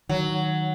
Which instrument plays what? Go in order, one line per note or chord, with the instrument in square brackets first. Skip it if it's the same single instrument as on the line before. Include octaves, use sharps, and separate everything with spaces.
[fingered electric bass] D#3 [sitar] F#3